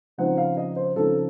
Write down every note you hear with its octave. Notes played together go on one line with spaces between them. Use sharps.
C#3 F3 C4 D#4 F#5
F5
D#5
C5
C#3 F3 C4 D#4 A4